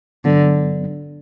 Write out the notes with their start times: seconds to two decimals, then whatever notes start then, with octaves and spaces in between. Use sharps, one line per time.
0.25 G2 D3 F#3 B3 D4